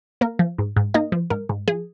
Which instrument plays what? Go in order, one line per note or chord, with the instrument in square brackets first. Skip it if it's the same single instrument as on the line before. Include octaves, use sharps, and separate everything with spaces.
[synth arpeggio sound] A#3 A#4
F3
G#2
G#2
A#3 D#4 D#5
F3
G#2 A#4
G#2
F3 G#4